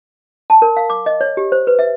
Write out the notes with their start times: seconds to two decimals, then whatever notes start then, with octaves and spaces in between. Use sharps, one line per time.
0.50 A5
0.62 A#4
0.77 F5
0.90 D6
1.06 D#5
1.21 C#5
1.37 G4
1.52 C5
1.67 B4
1.79 E5